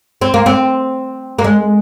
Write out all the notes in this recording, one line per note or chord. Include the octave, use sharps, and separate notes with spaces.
C4
A#3
C4
A#3
G#3